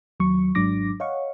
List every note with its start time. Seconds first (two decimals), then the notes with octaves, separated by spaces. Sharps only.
0.20 D#2 F#3 C#6
0.55 G#1 G#2 F#3 D4 D6 A#6
1.00 C#5 D#5 F5 F#5 C#6